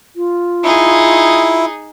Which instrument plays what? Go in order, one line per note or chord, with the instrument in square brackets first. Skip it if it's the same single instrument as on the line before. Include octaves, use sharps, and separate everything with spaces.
[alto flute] F4
[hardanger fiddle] D#4 G#4 [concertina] E4